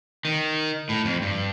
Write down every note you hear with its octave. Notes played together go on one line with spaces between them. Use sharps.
D#3
A2
F2
G2